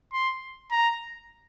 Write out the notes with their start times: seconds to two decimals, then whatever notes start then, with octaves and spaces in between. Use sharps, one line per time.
0.13 C6
0.71 A#5